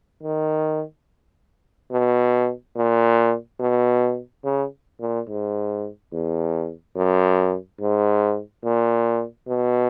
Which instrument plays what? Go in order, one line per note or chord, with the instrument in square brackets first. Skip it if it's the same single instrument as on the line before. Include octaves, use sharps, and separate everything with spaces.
[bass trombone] D#3
B2
A#2
B2
C#3
A#2
G#2
E2
F#2
G#2
A#2
B2